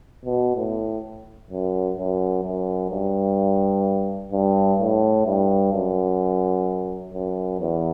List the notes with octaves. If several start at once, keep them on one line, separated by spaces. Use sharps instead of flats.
B2
A2
F#2
F#2
F#2
G2
G2
A2
G2
F#2
F#2
E2